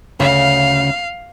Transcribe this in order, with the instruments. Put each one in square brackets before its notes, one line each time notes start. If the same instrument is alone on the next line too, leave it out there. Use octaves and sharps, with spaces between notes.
[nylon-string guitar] D2 C#3 [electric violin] F5